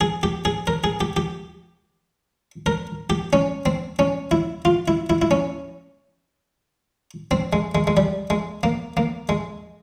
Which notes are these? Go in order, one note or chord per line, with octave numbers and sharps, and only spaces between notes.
G#4
G4
G#4
A#4
G#4
G4
G4
A#4
G4
C#4
C4
C#4
E4
F4
E4
E4
E4
C#4
C4
G#3
G#3
G#3
G3
G#3
A#3
A#3
G#3